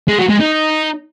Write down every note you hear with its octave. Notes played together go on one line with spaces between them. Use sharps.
G#3
F#3
G#3
D#4